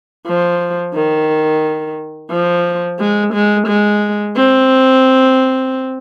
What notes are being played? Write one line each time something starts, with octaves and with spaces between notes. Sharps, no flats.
F3
D#3
F3
G#3
G#3
G#3
C4